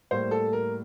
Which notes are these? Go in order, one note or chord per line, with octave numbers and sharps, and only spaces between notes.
A2 G3 A#3 C5
A4
A#4